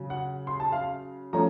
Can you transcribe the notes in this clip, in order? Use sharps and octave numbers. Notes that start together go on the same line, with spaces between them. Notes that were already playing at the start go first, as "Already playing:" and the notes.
Already playing: C#3 F#3
F#5
C6
A5
F5
F3 A3 C#4 A#5